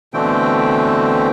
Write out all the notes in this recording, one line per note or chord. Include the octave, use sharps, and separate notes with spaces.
B2 D3 E3 A3 C4 G5